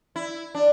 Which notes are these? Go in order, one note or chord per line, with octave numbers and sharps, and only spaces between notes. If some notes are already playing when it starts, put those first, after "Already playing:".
E4
D4